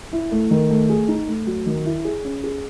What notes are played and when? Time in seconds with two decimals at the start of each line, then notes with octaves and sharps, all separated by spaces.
0.13 E4
0.31 A3
0.51 D#3
0.70 A3
0.90 G#4
1.08 D#4
1.28 A3
1.47 F#3
1.66 D#3
1.85 E4
2.05 G#4
2.24 C#4
2.44 G#4